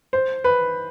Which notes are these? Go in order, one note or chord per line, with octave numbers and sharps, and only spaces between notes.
C5
B4